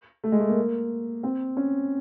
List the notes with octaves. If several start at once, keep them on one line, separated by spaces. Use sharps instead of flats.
A3
G#3
A3
A#3
C4
C#4